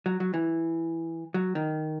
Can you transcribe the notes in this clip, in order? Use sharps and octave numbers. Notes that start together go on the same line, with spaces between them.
F#3
F#3
E3
F#3
D#3